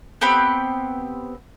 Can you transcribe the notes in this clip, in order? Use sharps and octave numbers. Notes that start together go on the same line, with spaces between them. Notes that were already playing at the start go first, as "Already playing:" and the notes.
B3 C4 G4 B5